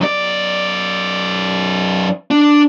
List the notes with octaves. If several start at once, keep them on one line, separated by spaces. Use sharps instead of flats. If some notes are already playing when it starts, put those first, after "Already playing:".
F#2 D5
D4